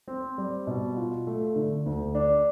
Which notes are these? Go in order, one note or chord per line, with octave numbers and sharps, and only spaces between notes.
C4
G3
B2
F4
A3
D3
D2
D4